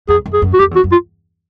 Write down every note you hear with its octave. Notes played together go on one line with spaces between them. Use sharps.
F2 G#4
F#2
G#4
F#2
F#4
F2 G4
E2
F#4
F#2
F4